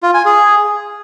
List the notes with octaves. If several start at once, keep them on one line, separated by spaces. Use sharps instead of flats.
F4
G#5
G#4